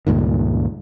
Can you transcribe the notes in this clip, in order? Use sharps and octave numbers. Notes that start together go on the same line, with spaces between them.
C#2 G2 A#2 D#3